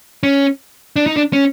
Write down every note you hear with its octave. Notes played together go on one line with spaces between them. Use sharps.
C#4
D4
D#4
D4
C#4